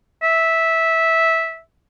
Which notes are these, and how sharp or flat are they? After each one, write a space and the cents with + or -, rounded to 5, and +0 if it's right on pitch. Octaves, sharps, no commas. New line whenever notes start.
E5 -10